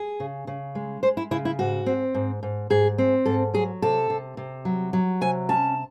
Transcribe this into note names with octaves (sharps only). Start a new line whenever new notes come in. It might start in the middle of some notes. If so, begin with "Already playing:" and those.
Already playing: G#4
C#3
C#3
G#3
G#3 C5
E4
C#3 E4
E4
G#2 F#4
C4
G#2
G#2
G#2 G#4
C4
G#2 A4
F#3 G#4
C3 A4
C3
C3
F#3
F#3
C3 G#5
C#4 A5